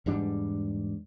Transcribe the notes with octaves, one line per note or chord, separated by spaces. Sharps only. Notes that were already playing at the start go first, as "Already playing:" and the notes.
E2 G#2 G3 D4